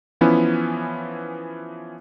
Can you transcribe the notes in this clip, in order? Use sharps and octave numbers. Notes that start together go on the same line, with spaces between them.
E3 F3 B3 C#4 E4